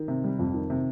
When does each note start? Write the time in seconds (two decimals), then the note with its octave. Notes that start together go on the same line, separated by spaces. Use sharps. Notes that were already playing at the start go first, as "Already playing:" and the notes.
Already playing: D#3
0.08 C3
0.24 G3
0.39 F2
0.54 D#3
0.70 C3